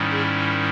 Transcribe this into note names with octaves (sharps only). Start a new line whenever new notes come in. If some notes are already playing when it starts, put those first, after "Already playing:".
Already playing: G#2 D#3 G3 C#4 E4
G#4